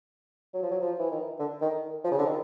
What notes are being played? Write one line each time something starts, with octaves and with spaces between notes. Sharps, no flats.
F#3
F3
F#3
F3
E3
D#3
D3
D#3
F3
C#3
D3
D#3